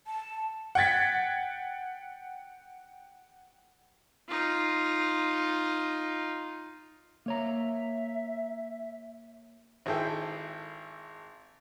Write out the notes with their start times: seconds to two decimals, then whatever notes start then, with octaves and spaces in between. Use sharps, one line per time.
0.07 A5
0.75 F#5 G5 G#6 A6 B6
4.28 D#4 F4
7.26 A#3 C#5 E5 A#5
9.86 G#1 E4 G#4 A4 G5